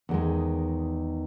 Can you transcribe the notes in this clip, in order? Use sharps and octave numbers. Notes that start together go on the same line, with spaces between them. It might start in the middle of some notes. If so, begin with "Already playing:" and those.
E2 D#3 G#3